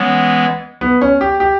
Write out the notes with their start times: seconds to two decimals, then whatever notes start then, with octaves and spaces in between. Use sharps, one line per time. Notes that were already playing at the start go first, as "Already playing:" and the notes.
Already playing: E3 G#3 B3 C#4
0.81 B3
1.01 C#4
1.21 G4
1.40 G4